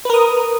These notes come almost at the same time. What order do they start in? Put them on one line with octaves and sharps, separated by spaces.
B4 A#4 D#6